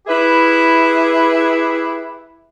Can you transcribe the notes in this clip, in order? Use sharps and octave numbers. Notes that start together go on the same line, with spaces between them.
E4 G4 G#4 B4 E5